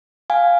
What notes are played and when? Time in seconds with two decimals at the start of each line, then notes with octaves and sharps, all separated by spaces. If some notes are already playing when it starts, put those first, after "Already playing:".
0.30 F5 G#5